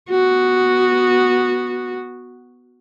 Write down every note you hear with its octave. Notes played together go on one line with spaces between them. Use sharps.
B3 F#4